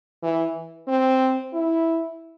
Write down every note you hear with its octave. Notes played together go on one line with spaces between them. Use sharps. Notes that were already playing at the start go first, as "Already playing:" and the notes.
E3
C4
E4